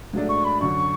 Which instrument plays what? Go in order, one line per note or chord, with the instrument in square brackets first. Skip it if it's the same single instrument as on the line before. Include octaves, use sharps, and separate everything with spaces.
[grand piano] G#2 F#3 A3 D4
[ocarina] C#6
B5
[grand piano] F#2 D3 F#3 [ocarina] C#6